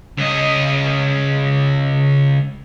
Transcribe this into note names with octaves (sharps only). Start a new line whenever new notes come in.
C#2 D#5